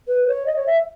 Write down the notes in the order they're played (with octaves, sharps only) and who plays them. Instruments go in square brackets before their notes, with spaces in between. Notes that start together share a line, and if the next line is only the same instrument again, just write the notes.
[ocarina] B4
C#5
D#5
C#5
E5